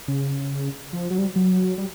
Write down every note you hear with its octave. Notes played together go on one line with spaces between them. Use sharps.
C#3
F3
F#3
G3
F#3
G3